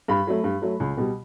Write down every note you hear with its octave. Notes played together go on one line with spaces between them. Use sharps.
G2 B5
F#3 A3
G2
F#3 A3
C#2
B2 G3